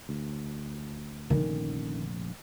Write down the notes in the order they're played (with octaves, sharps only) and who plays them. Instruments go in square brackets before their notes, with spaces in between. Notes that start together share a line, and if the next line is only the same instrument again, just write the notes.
[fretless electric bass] D2
[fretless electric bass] F1 A#1 D3 [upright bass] D#3 C#4